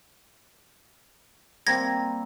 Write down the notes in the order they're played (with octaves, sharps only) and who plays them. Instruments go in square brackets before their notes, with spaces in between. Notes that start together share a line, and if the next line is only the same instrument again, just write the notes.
[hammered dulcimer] G3 A#3 C4 [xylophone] G#6 A#6